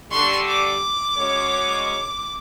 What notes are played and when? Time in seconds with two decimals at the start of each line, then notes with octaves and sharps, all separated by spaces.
0.11 D3 G3 C6 C#6
0.48 D6
1.16 F#2 G#3 C#5